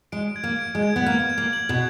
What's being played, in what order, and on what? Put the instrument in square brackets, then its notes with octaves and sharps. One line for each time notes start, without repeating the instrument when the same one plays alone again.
[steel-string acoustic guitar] G#3 [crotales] D7
[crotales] G#6
[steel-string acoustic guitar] A#3
[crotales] D7
[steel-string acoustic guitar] G#3
[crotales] G#6
[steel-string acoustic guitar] B3
[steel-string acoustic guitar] A#3 [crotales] G#6
[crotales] G#6
[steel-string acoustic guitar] A#3
[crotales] F#7
[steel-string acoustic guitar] B2 B3